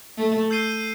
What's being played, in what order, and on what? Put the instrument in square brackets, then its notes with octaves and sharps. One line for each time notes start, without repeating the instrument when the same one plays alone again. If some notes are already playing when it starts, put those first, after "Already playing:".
[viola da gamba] A3
[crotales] E6 G6 C7 D#7 G7